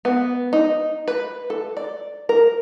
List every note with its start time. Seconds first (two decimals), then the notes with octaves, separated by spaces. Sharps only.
0.05 B3
0.53 D#4
1.08 B4
1.50 A4
1.77 D5
2.29 A#4